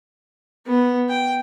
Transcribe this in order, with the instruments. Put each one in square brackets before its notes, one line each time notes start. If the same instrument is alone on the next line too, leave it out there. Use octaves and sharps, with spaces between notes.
[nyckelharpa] B3
G5